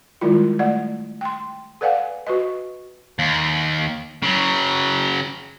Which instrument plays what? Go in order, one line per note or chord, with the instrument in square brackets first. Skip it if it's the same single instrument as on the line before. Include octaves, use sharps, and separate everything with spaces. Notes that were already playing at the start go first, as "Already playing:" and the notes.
[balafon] D#3 G3 G#3 E4 F4
A3 D5 F#5
G5 C6
A4 B4 D5 F5 F#5 G#5
F#4 B4 D#5
[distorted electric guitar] D#2
C#3 F#3